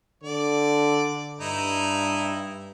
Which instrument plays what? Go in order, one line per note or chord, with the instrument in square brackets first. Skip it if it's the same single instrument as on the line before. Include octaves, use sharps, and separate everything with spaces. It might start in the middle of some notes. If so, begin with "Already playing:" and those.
[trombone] D3 [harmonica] D5
[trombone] G2 [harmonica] D#4 E4